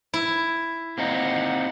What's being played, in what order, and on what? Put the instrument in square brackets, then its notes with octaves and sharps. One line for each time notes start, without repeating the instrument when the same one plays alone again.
[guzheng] E4
[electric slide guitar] A#3 C4 D#4 [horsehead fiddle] F#5